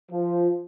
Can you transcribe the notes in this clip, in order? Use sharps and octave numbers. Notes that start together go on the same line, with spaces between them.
F3